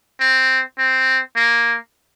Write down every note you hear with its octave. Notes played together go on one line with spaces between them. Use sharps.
C4
C4
A#3